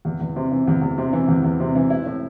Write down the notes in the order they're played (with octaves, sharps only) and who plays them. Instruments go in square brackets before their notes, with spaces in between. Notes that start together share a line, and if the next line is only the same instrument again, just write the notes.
[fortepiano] E2
E2
C3
E3
E2
E2
C3
E3
E2
E2
C3
E3
E4
A2